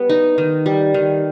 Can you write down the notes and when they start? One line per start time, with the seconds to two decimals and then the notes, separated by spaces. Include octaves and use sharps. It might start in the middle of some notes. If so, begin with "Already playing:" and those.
Already playing: G3 B3
0.10 D#4
0.38 D#3
0.66 G3
0.94 D#3